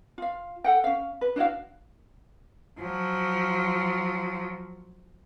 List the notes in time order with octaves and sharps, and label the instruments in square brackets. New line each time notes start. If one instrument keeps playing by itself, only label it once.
[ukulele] F4 F5
A4 F#5 G5
C#4 F5
B4
D4 E4 F#4 F5
[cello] F3 F#3